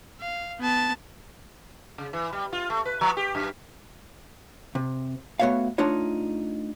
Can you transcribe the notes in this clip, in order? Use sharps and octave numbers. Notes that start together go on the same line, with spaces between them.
F5
B3 A5
C#3
E3
G3
F4
A3
B4
F3
G4
F#2
C3
A3 B3 F#4 C#5 E5 F5
A3 D4 D#4 F4 C#5